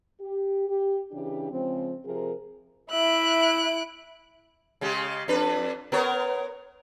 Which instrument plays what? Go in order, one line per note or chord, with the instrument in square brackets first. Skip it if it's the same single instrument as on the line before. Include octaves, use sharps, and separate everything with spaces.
[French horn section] G4
G4
C#3 E3 D4 G4
C#3 F3 G#3 C4
C3 F3 G#4 A#4
[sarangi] E4 [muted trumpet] E5 [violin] F#6 D7
[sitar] C#3 G#3 G4
F2 D4 B4
B3 A#4 C#5